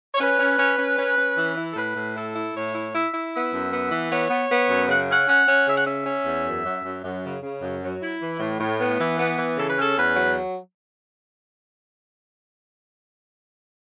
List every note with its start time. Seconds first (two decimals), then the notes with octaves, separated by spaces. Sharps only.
0.15 C#5
0.20 C#4 B4
0.39 C#4
0.59 C#4
0.78 C#4
0.98 C#4
1.17 C#4
1.37 E3
1.57 E4
1.71 A4
1.76 A2 B4
1.96 A2
2.15 E4 A4
2.35 E4
2.54 A2 C#5
2.74 E4
2.93 E4 E5
3.13 E4
3.33 B3 E5
3.52 F#2
3.72 B3
3.91 E3
4.10 B3 C#5
4.30 B3
4.49 B3
4.69 F#2
4.88 C#3 F#5
5.08 C#4 F#5
5.27 C#4 F#5
5.47 C#4
5.66 C#3 E5
5.75 F#5
5.84 C#4 E5
6.06 C#4
6.25 E2
6.45 F#2
6.65 F#2
6.84 F#2
7.04 F#2
7.23 C#3
7.42 C#3
7.62 F#2
7.81 F#3
8.01 E4
8.20 E3
8.40 A2
8.59 A2
8.79 B3
8.98 E3
9.18 B3
9.37 E3
9.57 C#3 A4
9.69 B4
9.77 C#4 A4
9.96 E2 B4
10.16 F#3